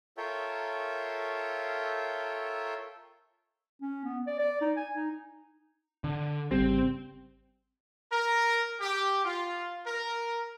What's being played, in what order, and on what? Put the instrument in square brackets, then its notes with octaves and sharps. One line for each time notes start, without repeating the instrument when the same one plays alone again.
[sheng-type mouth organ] F4 A4 A#4 C#5 E5 G5
[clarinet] C#4
B3
D5
D5
D#4
G#5
D#4
[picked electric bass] D3
[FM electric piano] G#1 C#3 G3 [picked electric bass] C4
[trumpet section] A#4
G4
F4
A#4